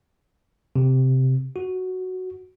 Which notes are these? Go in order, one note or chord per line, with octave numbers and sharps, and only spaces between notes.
C3
F#4